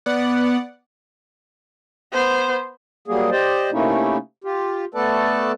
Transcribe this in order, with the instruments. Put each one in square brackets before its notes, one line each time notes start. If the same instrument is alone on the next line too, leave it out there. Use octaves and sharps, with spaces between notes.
[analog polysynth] B3 D5 F#5
[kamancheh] B3 C5
[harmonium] F#3 G3 A#3 G#4
G4 C5 D5 D#5
C3 A3 A#3 C#4 D#4 E4
F4 G4
A3 B3 A4 B4 D5 A5